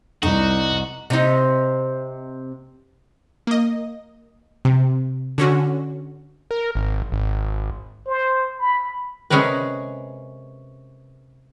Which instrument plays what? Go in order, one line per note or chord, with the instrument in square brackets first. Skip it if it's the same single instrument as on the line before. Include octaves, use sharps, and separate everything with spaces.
[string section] C2 [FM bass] F2 [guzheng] D#4 [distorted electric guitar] F#4
[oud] C3 D#4
[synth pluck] A#3 D#5
C3
D3 C#4 F#4
[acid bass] A#4
G#1
G#1
[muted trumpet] C5
B5
[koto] C3 G#3 C#4 G#4 A#4 B4